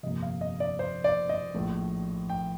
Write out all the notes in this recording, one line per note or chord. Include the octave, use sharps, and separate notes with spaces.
G1 F2 C3 F3 A#3 D#5
F5
D#5
D5
C5
D5
D#5
A#1 A2 F3 A3
G5